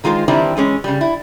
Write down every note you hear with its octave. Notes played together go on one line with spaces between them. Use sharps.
D#3 G#3 F4 A#4 C5
D#3 E3 G3 C4 D4 E4
E3 G#3 C#4
C#3 G3
E4